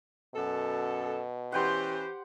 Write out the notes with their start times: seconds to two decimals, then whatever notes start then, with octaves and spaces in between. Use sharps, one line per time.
0.35 F#2 B2 A4
1.52 E3 C#4 G4 B4 C5 F#5 G5 C6